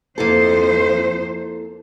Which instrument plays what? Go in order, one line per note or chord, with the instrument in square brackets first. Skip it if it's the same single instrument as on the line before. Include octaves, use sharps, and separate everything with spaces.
[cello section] F2 C5 [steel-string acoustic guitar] A#3 E4 A4